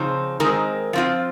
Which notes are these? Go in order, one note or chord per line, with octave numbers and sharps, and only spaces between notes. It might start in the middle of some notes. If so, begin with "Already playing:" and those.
Already playing: C#3 F3 C4 D#4
D#3 G#3 C4 D#4 A#4
F3 C4 F4